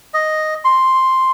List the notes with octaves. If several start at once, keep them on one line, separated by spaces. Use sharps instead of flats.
D#5
C6